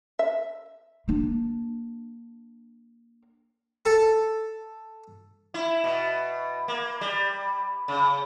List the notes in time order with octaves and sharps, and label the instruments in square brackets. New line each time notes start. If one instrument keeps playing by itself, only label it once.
[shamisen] E5
[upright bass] A#3 D4
[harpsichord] A4
[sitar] E4
B2
A#3
G3
C#3